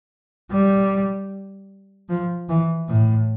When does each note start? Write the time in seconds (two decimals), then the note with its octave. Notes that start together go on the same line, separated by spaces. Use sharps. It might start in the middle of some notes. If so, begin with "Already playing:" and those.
0.51 G3
2.10 F3
2.49 E3
2.89 A2